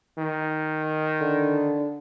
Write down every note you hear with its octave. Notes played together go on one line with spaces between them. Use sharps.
D#3
D3